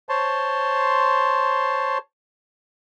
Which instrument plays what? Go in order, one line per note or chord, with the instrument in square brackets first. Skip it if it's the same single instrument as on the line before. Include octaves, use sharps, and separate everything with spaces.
[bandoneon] C5 C#5 A5 C6